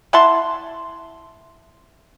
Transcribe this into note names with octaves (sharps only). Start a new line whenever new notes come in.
E4 F#5 A5 C6